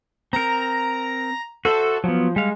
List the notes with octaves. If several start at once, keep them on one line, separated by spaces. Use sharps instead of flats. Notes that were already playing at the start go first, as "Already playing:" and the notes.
C4 A#4 A#5
F#4 A4 C5 E5
F3 F#3 B3
G3 G#3 F5